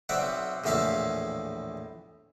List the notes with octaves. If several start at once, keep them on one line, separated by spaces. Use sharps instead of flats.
B1 C4 D5 E5 F#5
A#1 E2 A2 E5 F5 A5